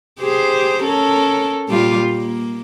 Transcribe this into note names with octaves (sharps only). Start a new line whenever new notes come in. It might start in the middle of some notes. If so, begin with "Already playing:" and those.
G4 G#4 C5
C#4 A4 A#4
A#2 G3 F4
A#3